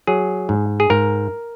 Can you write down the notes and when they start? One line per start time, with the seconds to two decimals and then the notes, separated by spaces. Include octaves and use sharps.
0.07 F#3 G#4
0.49 G#2
0.80 G#4
0.90 G#2 A#4